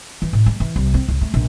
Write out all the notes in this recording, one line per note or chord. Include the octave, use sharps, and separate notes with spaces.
E3
A2
G#3
E3
C2
C4
C#2
A3
A#1